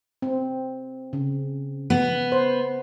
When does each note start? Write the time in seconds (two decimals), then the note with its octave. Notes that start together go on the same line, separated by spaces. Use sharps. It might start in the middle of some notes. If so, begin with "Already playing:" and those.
0.22 C4
1.13 C#3
1.90 B3
2.32 C5